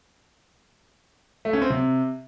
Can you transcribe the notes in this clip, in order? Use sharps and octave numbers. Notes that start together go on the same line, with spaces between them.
A3
C#4
C4
C3